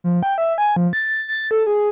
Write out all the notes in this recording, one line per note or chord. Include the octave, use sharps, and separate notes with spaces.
F3
G5
E5
G#5
F3
A6
A6
A4
G#4